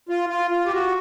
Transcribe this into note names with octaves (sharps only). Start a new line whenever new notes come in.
F4
F4
F4
G4
F#4